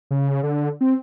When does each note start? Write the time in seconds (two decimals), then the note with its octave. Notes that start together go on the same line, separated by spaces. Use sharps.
0.11 C#3
0.43 D3
0.81 C4